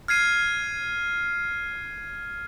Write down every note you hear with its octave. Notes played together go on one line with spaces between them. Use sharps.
F6 G#6 C7 D#7